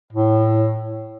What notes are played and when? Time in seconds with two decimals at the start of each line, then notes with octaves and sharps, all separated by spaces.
0.13 A2